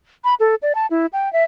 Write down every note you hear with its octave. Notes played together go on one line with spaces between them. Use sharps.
B5
A4
D5
A5
E4
G5
E5